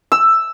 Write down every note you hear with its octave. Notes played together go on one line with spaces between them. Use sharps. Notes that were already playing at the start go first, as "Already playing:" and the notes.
E6